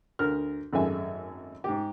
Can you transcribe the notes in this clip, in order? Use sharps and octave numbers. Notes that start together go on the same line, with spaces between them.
D2 A#4 F6
G#1 F#2 A3 G#4 E5 G#5
G#2 G4